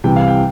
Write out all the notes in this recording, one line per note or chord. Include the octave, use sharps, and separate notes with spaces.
C2 C3 E3 G5
F5
G5